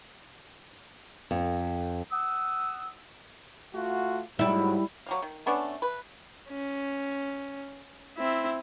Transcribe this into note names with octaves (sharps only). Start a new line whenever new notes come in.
F2
F#5 D#6 E6
A3 F4 F#4
G#2 F#3 G3 E4
F#3 G3 F5
D#3
A3 B3 C#4 D4
B4
C#4
C4 E4